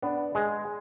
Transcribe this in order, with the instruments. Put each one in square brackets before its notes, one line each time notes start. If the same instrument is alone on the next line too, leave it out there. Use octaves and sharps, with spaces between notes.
[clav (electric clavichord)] B3 [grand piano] D4
[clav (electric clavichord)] G#3 [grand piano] G#4